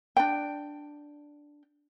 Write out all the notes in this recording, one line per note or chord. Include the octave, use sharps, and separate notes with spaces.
D4 G5